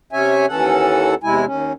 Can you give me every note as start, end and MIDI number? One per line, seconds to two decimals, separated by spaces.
0.13 0.46 48
0.13 0.46 61
0.13 0.46 73
0.13 0.46 76
0.13 0.46 80
0.49 1.14 39
0.49 1.14 52
0.49 1.14 61
0.49 1.14 69
0.49 1.14 78
1.23 1.45 40
1.23 1.45 48
1.23 1.45 56
1.23 1.45 64
1.23 1.45 80
1.46 1.73 39
1.46 1.73 61